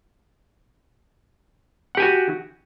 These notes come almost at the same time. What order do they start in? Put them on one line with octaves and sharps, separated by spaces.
F#5 G4 G#5 F#4